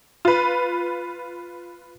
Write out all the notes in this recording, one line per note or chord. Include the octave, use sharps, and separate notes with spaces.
F4 B4